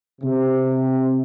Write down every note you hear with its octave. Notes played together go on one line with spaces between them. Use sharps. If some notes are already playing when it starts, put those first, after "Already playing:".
C3